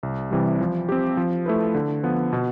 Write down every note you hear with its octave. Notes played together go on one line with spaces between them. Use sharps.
C2
C3 E3 G3
F3
C4 G4
F3
A3 E4 B4
D3
F3 B3
B2